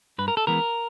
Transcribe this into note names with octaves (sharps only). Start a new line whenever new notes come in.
G2 B4
A#4
A4
E3 G#3 B3 A#4